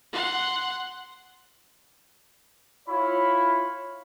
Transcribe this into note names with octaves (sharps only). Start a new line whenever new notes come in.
F#5 C6
E4 F4 C#5 B5